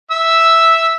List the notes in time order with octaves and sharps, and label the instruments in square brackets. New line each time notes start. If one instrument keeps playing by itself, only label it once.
[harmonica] E5 E6